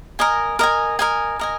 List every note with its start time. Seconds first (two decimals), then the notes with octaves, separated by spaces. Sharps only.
0.19 A#4 D#5 G#5
0.59 A#4 D#5 G#5
0.99 A#4 D#5 G#5
1.39 A#4 D#5 G#5